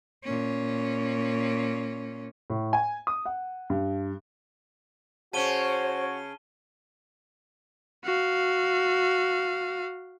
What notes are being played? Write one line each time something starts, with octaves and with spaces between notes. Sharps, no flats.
A#2 C#4
A2
G#5
D#6
F#5
G2
C#3 C#4 F#4 C5 A5 D#7 G7
F#4 F5